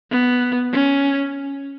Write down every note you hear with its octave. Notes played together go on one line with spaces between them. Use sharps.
B3
C#4